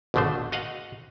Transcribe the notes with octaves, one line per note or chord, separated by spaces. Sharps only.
G#1 D#2 B2 D3 A3 C5
F#4 D#5 F5 F#5